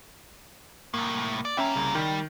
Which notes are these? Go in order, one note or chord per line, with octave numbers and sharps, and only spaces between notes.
C2 A2 A#3
D5
G2 A#3 C#4 E5 G5
C2 C#3
D#3 G3